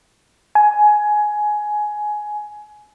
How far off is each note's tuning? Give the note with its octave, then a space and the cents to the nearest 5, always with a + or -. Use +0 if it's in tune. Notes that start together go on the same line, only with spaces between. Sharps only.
G#5 +15